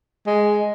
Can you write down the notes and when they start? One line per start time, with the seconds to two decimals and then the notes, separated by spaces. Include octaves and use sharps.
0.26 G#3